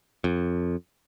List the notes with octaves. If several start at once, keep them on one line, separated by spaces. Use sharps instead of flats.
F2